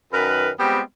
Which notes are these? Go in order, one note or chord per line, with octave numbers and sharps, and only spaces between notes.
F#2 D#3 A#4 B4
G3 G#3 B3 C4 F4 G4